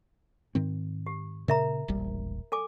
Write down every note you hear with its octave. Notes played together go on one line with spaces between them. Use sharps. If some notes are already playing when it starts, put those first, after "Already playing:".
G#2 D#3 C4
G4
A#2 C#3 A#4 E5 A#5
E1 A#1 G3
A4 G#5 D6